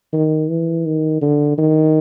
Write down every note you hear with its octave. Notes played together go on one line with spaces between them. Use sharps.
D#3
E3
D#3
D3
D#3